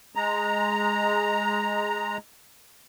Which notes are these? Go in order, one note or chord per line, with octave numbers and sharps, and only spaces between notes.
G#3 A#5